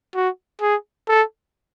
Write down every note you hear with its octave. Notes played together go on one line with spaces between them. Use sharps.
F#4
G#4
A4